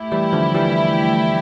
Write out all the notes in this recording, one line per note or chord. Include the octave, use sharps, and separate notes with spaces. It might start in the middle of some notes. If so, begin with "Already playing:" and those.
Already playing: A3 E4 G4
E3 G3
D3 F3
E3 G3